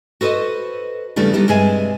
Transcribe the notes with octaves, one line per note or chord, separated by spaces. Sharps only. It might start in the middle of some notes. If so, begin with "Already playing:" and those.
F#4 A4 B4 C5 D#5
E2 C#3 G3 A3 D4 E4
G3 B3 D#4 E4 G4
G2 C3 G#3 G#4 E5 G#5